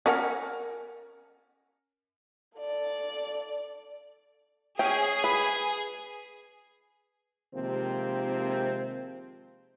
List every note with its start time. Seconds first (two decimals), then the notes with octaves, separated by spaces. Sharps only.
0.06 C#4 A#4 F#5
2.58 A4 D5
4.79 C#4 G#4 G5
5.24 B4
7.55 C3 D#3 F3 G#3 A#3 C4